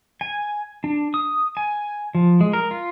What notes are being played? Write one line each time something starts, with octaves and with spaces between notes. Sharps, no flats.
G#5
D4
D#6
G#5
F3
G#3
A#4
F4